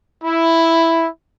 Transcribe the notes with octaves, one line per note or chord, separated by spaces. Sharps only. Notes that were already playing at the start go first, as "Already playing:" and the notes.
E4